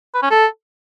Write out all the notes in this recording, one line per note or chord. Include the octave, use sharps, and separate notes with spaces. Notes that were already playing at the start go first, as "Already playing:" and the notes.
B4
C#4
A4